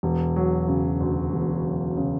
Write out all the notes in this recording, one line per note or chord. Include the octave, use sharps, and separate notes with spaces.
E1
F#3
C#3
D2
E1
F#3
C#3